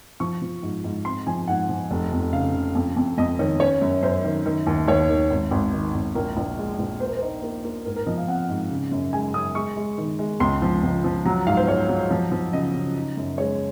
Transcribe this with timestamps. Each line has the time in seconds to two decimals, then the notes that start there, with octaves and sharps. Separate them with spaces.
0.20 F3 C#6
0.42 F3
0.63 G#2
0.84 G#2
1.05 C4 C6
1.27 F3 G#5
1.48 G#2 F#5
1.69 F3
1.91 F1
2.12 F2
2.33 C#3 F5
2.54 C#3
2.75 F2
2.97 F2
3.18 F2 D#5
3.39 D#3 C#5
3.60 C#4 C#5
3.82 F#2
4.03 F#2 C5
4.24 D#3
4.46 D#3
4.67 D#2
4.87 D#2 C#5
5.09 D#3
5.30 G#1
5.51 G#1
5.73 D#3
5.94 G#1
6.15 A#1 A#4
6.37 A#1
6.58 G#3
6.79 A#1
7.00 A#3 C5
7.08 A#4
7.17 D#4 C5
7.42 A#3
7.64 A#3
7.85 G#2 A#4
7.96 A#4
8.07 F3 D#5
8.18 F5
8.28 C4 F#5
8.49 G#2
8.70 C#3
8.91 F#2
9.13 G#3 G#5
9.34 F#2 D#6
9.55 G#3 C#6
9.76 G#3
9.98 D#3
10.19 G#3
10.40 C#2 C6
10.62 F3
10.83 C#2
11.04 F3
11.25 F#3 A#5
11.47 G#2 F5
11.57 C5
11.68 G#2 C#5
11.89 F#3
12.10 F3
12.31 F3
12.53 C#3 D#5
12.74 C#3
12.95 D#4
13.17 F#2
13.38 G#3 C#5